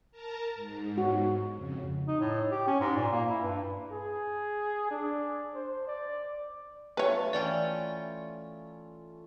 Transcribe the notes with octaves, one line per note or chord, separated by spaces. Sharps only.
A#4 A5 A#5
G#2
F#4
F2 C#3
D#4
A2
G4
C#4
G#2
A#2
A#3
E4
G2
G#4
D4
C5
D5
A3 F4 B4 C#5
E3 C#4 D5 G5